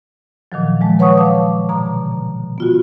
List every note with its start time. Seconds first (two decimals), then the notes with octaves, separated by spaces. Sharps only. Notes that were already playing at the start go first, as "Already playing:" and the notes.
0.52 A#2 D#3 F3 F#3
0.81 F3 G#3 A5
0.99 B4 C#5 F#5 C#6 D#6
1.18 F5 A5 D6
1.69 G#2 B2 D3 A#5
2.58 B3 F4 F#4